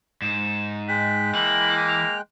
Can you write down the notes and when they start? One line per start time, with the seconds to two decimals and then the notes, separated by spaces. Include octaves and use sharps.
0.22 G#2 E7
0.89 G#3 G5 F#6 B6
1.34 E3 A#3 F#7
1.89 F7